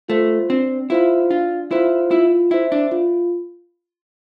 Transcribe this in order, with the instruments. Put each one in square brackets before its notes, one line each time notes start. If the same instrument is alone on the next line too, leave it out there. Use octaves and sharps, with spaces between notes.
[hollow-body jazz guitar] A3 [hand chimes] F4 C5
[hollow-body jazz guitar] C4 [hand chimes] D4
[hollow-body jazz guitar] E4 [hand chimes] F4 C5 F5
[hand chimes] D4 [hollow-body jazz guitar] F4
[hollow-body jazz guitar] E4 [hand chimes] F4 C5 F5
[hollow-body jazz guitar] E4 [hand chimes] F4
[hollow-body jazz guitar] E4 [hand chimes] C5 E5
[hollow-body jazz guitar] D4
[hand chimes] F4